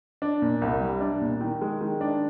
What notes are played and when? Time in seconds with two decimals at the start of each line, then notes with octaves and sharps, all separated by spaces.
0.22 D4
0.42 A#2
0.62 C2
0.81 G3
1.01 D4
1.21 A#2
1.41 D#3
1.61 G#3
1.81 D#3
2.01 D4